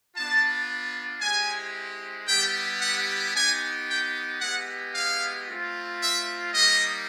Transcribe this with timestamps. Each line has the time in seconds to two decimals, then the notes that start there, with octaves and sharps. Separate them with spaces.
0.16 B3 D4 F4 A5
1.21 G#3 C4 E4 G4 G#5
2.28 G3 B3 E4 G4 G5
2.81 F#5
3.34 B3 D#4 G4 G#5
3.87 G5
4.41 G#3 B3 E4 G4 F#5
4.94 F5
5.48 A3 C4 F4
6.01 E5
6.54 G3 A#3 D#4 D#5